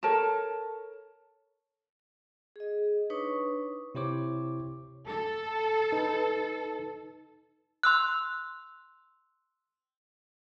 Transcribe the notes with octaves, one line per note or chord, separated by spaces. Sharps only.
A4 A#4 C#5 A5
G#4 D#5
D4 D#4 B4 C#5 C#6 D#6
C3 E4 G4 C5 C#5 D6
A4
D#4 B4
C6 E6 F#6